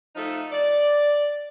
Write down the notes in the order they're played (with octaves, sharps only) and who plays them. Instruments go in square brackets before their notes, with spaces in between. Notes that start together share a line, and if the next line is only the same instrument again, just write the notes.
[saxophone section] F3 A3 D#4
D5